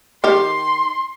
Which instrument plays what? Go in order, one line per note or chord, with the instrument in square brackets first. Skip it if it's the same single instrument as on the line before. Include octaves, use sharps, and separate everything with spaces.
[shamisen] D#3 G4 [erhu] C6